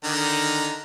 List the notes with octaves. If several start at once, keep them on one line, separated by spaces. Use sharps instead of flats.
D3 D#3 A#5